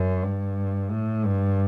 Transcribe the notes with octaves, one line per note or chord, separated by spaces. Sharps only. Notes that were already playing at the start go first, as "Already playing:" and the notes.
Already playing: F#2
G2
A2
G2